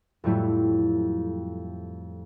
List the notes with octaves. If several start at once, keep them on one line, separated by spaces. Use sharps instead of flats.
F2 A2 F#3 G3 A3 E4